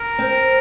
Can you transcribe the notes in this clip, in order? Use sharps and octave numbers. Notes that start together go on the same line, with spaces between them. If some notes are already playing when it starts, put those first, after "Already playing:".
Already playing: A#4
C4